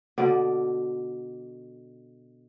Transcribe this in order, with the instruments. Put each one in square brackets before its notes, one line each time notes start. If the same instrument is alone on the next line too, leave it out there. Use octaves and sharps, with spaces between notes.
[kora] B2 D3 D5